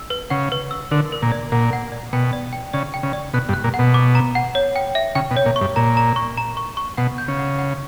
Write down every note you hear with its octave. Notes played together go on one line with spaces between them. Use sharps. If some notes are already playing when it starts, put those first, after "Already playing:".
Already playing: E6
B4
C#3 F#5
B4
E6
D3 A#4
A#4
A#2
D5
A#2 F#5
F#5
D5
B2 G5
D5
G5
C#3 D5
G5
C#3
D5
B2 F#6
G2
F#6
A#2
F#5
B2
D6
A#5
F#5
C#5
G5
E5
C#3 G5
B2
C#5
A#2
C#6
G2
A#2 A#5
A#5
C#6
A#5
C#6
C#6
B2 F#5
G6
C#3
F#5
F#5